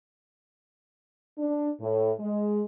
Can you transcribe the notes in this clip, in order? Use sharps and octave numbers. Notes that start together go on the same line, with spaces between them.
D4
A2
G#3